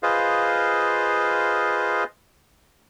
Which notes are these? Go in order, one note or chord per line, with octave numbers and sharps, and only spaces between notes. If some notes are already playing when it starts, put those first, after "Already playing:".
F4 G#4 B4 C5 D#5 F5